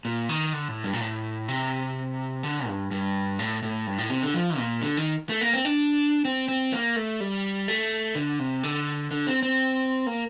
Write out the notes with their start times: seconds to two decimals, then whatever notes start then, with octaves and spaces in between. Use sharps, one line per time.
0.05 A#2
0.29 D#3
0.53 D3
0.68 A2
0.84 G2
0.93 A#2
1.00 A2
1.48 C3
2.43 D3
2.67 G2
2.91 G2
3.39 A2
3.63 A2
3.87 G2
3.98 A2
4.10 C3
4.22 D3
4.34 F3
4.58 A#2
4.82 D3
4.97 D#3
5.29 A3
5.41 A#3
5.53 C4
5.65 D4
6.25 C4
6.48 C4
6.73 A#3
6.96 A3
7.20 G3
7.68 A3
8.15 D3
8.39 C3
8.63 D3
9.11 D3
9.27 C4
9.42 C4
10.07 A#3